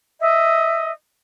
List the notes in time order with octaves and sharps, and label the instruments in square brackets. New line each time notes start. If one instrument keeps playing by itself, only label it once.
[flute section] D#5 E5